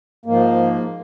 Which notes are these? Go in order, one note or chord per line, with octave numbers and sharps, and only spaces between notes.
G#2 F3 A#3